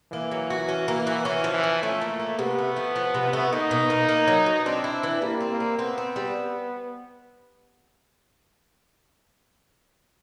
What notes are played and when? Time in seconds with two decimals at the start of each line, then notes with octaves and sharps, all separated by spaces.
0.12 E3 A#3
0.31 F#3
0.50 F#4
0.68 C#4
0.88 A#3
1.07 F#4
1.25 E3 C#4
1.44 F3
1.54 E3
1.64 F3
1.83 A3 C#4
2.01 A#3
2.19 A#3
2.39 C3 B3
2.58 A3
2.76 F3
2.96 F3
3.14 C3
3.33 A3
3.53 A#3 D#4
3.71 B2
3.90 A#3
4.09 A#3
4.28 F#3
4.46 B2
4.65 C4 D4
4.84 E4
5.03 E3
5.22 G3 A#3
5.40 C4
5.50 A#3
5.60 C4
5.79 B3 C4
5.98 C4
6.16 G3